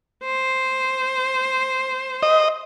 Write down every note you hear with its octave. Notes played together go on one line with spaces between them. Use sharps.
C5
D#5